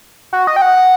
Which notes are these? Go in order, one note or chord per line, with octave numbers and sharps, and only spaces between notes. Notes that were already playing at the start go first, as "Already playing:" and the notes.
F#4
D#5
G5
F#5